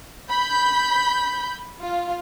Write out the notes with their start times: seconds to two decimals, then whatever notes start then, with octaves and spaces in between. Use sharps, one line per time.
0.28 B5 G6
1.80 F4